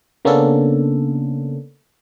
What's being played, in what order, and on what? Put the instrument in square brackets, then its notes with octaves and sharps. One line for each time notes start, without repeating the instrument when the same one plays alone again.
[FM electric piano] C#3 A#3 B3 C#4 D4 A4